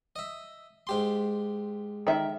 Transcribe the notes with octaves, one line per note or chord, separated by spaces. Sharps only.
D#5 E5
G#2 G4 C6
D#3 E5